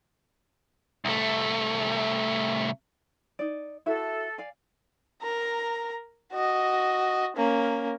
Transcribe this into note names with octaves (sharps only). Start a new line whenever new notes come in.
C2 A3
D#4 D5
E4 F#4 A4 E5
D5 F5 G#5
A#4 A#5
F#4 D#5
A#3 C#4